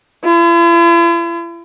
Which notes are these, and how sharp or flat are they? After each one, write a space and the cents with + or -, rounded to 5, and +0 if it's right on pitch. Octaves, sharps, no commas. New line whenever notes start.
E4 +45